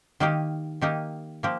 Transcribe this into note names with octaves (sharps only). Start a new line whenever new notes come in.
D#3 A#3 D#4 G4
D#3 A#3 D#4 G4
F3 A#3 G4